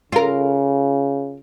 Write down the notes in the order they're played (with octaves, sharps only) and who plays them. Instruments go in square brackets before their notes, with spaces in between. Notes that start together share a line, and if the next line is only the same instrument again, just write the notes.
[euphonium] C#3 [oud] F4 A#4